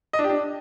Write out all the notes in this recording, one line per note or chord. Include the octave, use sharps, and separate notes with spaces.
D#5
D4
G4
D4